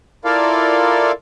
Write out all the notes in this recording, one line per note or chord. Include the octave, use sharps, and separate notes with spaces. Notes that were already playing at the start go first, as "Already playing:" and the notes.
E4 F4 A4 A#4 D5 F5